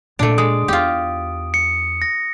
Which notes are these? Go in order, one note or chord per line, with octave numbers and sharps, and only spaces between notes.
A#2 A3 D4 E4 D7
G#3 D#6
E2 F4 G4
C#7
A#6